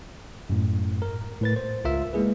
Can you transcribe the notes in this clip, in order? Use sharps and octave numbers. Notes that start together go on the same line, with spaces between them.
F#2 A2
A#4
A2 B4 A6
C5
C#2 F4 A#4 E5 E6
G#3 A#3 E4 G#4 B4